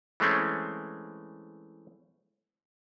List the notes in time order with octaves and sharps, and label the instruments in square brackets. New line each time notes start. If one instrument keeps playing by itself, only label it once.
[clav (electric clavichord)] E3 G#3 A3 C4 C#4